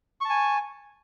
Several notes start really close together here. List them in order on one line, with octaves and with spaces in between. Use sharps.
C#6 A5 G#5